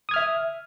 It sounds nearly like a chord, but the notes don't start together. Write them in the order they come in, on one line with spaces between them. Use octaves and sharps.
D#6 G#6 F6 E5